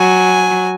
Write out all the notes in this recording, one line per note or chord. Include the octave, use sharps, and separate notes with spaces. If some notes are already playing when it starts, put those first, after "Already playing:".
Already playing: F#3 G#5